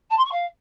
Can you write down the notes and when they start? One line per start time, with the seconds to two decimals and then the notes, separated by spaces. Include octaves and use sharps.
0.10 A5
0.17 C6
0.24 C#6
0.31 F5